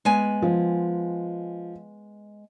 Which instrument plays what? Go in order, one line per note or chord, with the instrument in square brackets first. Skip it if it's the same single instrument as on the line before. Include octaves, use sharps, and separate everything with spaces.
[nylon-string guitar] G#3 B3 G#5
[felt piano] F3